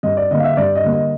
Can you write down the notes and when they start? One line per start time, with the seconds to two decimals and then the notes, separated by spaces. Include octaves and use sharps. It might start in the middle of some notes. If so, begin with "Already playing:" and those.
0.03 G2 D#5
0.17 D5
0.30 D3 G3 A#3 D#5
0.39 F5
0.44 E5
0.57 G2 D5
0.75 D#5
0.84 D3 G3 A#3
0.93 D#5